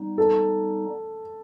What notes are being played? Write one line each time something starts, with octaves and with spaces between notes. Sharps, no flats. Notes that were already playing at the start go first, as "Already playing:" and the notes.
Already playing: G3 B3 D#4
A4